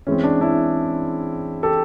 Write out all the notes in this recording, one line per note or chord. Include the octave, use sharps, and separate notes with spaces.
E3 G#3 C4 C#4
D4
D4 E4
G4 A4